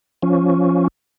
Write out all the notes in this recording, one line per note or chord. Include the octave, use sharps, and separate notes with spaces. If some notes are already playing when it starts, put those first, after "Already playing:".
F3 C#4